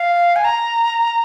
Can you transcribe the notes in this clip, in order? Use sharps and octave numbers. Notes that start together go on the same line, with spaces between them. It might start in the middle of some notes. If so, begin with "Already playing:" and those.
Already playing: F5
G#5
A#5